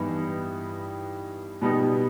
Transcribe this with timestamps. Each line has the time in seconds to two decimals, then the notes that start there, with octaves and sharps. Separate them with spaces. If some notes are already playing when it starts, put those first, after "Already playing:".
Already playing: G2 E3 G3 B3 D#4
1.62 B2 G3 B3 D#4